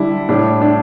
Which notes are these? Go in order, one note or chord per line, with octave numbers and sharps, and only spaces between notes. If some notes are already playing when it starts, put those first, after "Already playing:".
Already playing: D3 G3 D4 E4
A2 G3 D4
D4